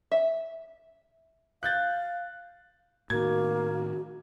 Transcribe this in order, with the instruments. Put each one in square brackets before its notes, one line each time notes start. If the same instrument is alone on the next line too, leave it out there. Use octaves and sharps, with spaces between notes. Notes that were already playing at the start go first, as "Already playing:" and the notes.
[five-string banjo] E5
[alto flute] F5 [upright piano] F#6 G6 A6
[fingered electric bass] A2 D#3 [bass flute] A#3 [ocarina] F#4 [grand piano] G#6